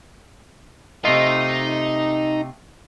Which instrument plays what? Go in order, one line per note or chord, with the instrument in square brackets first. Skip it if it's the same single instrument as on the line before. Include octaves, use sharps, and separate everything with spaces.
[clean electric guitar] C3 A3 F4 [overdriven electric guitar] D#4